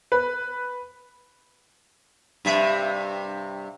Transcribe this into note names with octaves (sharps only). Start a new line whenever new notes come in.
B4
G2 C3 E5